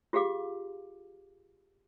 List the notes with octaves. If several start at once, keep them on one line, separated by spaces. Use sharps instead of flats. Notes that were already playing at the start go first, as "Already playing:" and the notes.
F4 G4 G#4 F5 D6